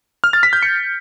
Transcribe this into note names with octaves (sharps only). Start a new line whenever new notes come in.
F6
A6
B6
G6
C#7